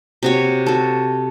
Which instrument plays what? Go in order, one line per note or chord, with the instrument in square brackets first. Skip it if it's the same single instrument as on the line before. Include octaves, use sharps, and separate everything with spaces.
[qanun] C3 F#4 C#5
F#4 A4